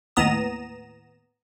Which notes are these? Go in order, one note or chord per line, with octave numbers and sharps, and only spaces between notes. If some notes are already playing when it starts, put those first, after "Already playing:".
D#2 A2 B3 A#5 D#6 E7